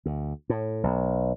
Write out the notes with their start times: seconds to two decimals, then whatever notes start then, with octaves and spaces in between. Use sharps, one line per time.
0.06 D2
0.49 A2
0.83 B1